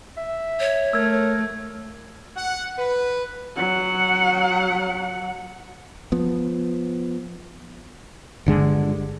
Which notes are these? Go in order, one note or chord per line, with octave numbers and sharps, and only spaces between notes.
E5
C#5
A3 A#4 E6 G#6
F#5
B4
F#3 F#5
F3 B3
G1 D3 G#3